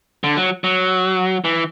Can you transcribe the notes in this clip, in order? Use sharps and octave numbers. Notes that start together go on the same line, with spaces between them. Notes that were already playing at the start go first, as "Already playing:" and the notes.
D3
F#3
F#3
E3